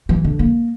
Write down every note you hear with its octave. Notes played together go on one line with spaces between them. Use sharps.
E3
D3
A#3